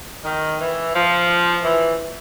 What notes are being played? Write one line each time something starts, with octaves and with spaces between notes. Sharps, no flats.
D#3
E3
F3
E3